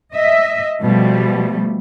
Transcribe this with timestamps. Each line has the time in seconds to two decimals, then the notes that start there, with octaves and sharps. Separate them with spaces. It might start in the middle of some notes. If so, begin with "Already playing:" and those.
0.13 D#5 E5
0.81 B2 F3 G3 A3